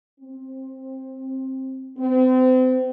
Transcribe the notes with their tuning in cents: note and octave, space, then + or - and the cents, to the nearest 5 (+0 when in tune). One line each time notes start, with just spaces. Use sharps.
C4 +15
C4 -35